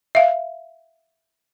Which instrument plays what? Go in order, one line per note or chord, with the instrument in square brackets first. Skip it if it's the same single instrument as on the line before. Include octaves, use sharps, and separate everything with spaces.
[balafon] E5 F5